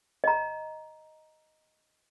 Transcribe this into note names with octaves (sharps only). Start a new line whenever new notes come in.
D#5 A#5